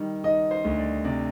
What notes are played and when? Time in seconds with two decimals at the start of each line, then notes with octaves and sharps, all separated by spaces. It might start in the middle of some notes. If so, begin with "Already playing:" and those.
Already playing: D#3 G3
0.24 D#3 D#5
0.51 C5
0.65 D2
0.78 D5
1.05 C3 D5